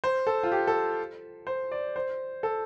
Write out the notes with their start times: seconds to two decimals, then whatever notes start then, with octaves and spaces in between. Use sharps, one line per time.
0.04 C5
0.27 A4
0.43 F4
0.52 G4
0.67 A4
1.47 C5
1.72 D5
1.96 C5
2.43 A4